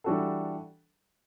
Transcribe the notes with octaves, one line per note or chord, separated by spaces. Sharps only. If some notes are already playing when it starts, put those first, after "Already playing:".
E3 G3 D4 F#4 A4